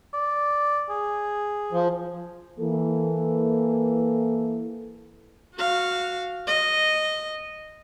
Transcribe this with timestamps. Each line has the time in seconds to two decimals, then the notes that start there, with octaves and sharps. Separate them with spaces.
0.14 D5
0.90 G#4
1.72 F3
2.59 E3 A#3 A4
5.55 F#4 F5
6.47 D#5